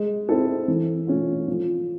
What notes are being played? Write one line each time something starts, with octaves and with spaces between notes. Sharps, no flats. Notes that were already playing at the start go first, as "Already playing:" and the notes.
Already playing: G#3
C4 E4 A4
E3
A3 C#4 F4
F3